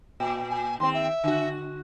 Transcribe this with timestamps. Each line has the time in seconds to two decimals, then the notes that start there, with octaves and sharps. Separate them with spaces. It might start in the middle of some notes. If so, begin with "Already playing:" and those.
0.20 A#2
0.50 G#5
0.80 D#2 C4 C6
0.94 E5
1.24 D3 F#4